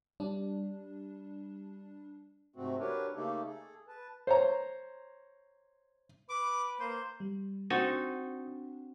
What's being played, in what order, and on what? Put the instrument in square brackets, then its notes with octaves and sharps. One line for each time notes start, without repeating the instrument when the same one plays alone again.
[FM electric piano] G3 D4
[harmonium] G#2 C3 A3 C4 F#4
D4 F#4 G4 A#4 B4 C#5
C#3 A3 A#3 D#4 G4 A4
G#4 A4
B4 A5
[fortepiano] C5 C#5 A#5
[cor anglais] B4 [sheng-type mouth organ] D6
[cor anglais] A#3 [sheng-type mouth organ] C5
[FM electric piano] G3
[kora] C4 F#4 [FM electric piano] D4 [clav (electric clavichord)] D#4 A4 G#5